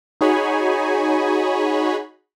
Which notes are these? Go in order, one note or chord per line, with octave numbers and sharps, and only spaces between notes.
D#4 F#4 G#4 C#5 G#5 B5